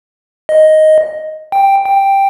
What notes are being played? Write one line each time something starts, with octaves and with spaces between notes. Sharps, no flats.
D#5
G5
G5